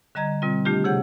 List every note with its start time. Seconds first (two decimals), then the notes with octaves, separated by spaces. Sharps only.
0.15 D3 G3 D#5 A#5 G#6
0.42 B2 G3 C4 F4
0.65 D#3 A3 D4 F4 G4
0.84 C3 G#4 C#5 F#5 G6